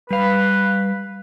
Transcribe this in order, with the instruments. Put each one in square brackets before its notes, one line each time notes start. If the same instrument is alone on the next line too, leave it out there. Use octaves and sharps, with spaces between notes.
[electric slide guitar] G3 F5 [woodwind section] B4